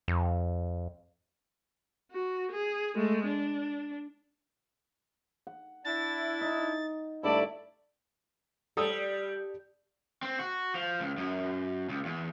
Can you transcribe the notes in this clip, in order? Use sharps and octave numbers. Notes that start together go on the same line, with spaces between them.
F2
F#4
G#4
G#3 A3
D4
F#5
D4 E4 A6
D#4
G2 D3 A3 E4 D5 B5
G3 A4 D#6 E6
C4
F#4
F3
C#2
F#2
C#2
E2